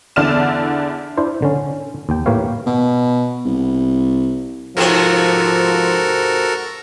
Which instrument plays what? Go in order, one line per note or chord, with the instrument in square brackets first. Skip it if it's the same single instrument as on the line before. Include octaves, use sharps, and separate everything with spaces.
[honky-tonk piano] E2 D3 E4 D5 F6 E7
[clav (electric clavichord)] D4 E4 C5
D3 C#4
D#2 G5
A2 A#3 G4 B4 C#5 F5
[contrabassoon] B2
C2
[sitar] G#2 C3 B3 [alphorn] F3 [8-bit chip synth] F#4 A4 A#4